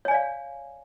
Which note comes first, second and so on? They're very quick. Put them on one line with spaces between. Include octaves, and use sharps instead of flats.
C#5 G#5 D5 F5